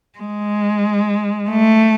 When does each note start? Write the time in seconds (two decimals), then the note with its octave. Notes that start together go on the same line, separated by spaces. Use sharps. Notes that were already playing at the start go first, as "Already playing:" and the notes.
0.19 G#3
1.50 A3